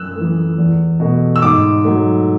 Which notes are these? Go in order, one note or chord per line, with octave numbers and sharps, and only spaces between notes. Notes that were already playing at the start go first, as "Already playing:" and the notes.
Already playing: F#2 E6 F#6
E3 A3
E2
B2 A3
E6
G#2 D6
F#3 A3